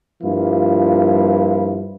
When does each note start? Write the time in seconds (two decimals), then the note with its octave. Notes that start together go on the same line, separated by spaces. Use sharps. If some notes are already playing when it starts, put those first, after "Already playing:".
0.22 G2 F3 A#3 E4 F4